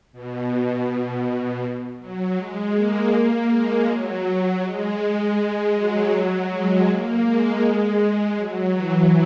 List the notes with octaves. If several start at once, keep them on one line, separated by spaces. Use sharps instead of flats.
B2
B2
F#3
G#3
A#3
G#3
F#3
G#3
F#3
G#3
A#3
G#3
F#3
E3